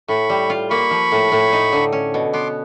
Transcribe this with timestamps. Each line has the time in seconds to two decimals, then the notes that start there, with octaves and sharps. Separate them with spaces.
0.08 A2 B5 C#6
0.30 G3
0.50 F4
0.70 A#3 B5 C#6
0.91 F3
1.12 A2
1.32 A2
1.53 D#4
1.72 D3
1.93 C#4
2.14 B2
2.33 B3 C6 D6